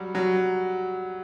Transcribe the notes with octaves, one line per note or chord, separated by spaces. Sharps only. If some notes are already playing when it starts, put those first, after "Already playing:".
Already playing: F#3 G3
F#3